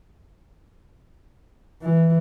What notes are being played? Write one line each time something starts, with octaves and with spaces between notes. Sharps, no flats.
E3